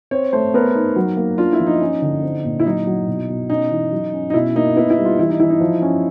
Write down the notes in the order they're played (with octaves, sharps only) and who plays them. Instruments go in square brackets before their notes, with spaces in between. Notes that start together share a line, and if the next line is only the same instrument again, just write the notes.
[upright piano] C4 [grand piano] C#5
[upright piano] A3 [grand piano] C5
[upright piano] B3 [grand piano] A#4
[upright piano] D#4
F#3
A#3
[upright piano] D4 [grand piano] F4
[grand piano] E4
[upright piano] F3
[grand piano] D#4
[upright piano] C#4
D3
C4
A#2
[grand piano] E4
[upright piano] F#3 [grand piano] D#4
[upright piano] F#3
B2
B2
[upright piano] C#4 [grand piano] D#4
[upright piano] E3
F#3
C#4
[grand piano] D#4
[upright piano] B2 [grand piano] E4
[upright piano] A#3 [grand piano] D#4
[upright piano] B3 [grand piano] E4
[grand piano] E4
[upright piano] G3
[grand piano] F4
[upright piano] E3 [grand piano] E4
[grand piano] D#4
[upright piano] E3 [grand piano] E4
[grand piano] D#4
[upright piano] F3
C#4